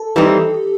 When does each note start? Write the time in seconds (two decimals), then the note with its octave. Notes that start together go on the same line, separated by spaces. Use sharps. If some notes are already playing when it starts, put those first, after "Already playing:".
Already playing: A4
0.16 E3 G3 C4 D#4 G4